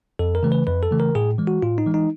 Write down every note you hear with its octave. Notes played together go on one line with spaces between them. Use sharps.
F2 A4
A#4
C#3 E3 A3
B4
F2 B4
A4
C#3 E3 A3
A#4
A2 G#4
E3 G#3
F#4
A2 F4
D#4
E3 G#3
D#4